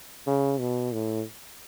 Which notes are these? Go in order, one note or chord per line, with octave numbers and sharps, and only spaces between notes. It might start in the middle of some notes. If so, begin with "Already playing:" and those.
C#3
B2
A2